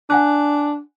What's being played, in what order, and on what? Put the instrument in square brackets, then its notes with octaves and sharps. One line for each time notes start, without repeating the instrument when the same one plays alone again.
[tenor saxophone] D4 [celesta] F#5 G#5 F#6